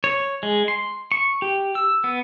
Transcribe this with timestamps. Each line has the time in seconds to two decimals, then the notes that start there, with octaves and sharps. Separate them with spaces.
0.04 C#5
0.43 G#3
0.68 C6
1.12 C#6
1.42 G4
1.75 E6
2.04 B3